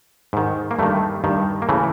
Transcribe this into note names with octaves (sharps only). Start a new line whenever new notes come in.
G#2 D#3
A#3
G2 D#3 A3
G2 D#3
A#3
C#3 E3 A3